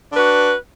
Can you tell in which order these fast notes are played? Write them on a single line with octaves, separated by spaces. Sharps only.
D4 B4 F#4